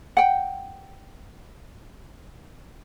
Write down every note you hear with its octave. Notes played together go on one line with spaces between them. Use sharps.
F#5 G5